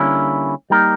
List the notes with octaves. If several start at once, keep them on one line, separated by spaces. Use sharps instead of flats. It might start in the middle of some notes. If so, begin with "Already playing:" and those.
Already playing: D3 G3 A#3 C#4 E4
G3 A#3 D#4 G4 A#4